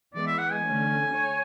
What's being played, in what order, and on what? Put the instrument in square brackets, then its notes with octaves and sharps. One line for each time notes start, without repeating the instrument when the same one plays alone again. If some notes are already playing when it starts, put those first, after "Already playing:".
[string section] E3 G#3 B3 [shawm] D5
[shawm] E5
F#5
G#5
[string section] D3 A3 C#4
C#5